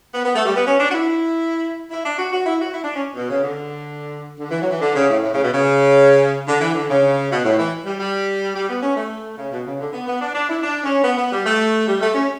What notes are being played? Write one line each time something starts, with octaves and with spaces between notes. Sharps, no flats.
B3
B3
A3
G3
B3
C#4
D4
F#4
E4
E4
D4
F#4
F#4
E4
F#4
E4
D4
C#4
B2
C#3
D3
D3
E3
F#3
E3
D3
C#3
A2
A2
C#3
B2
C#3
D3
E3
D3
C#3
B2
A2
E3
G3
G3
G3
B3
C#4
A3
C#3
B2
C#3
D3
B3
B3
D4
D4
E4
D4
C#4
B3
B3
G3
A3
G3
A3
C#4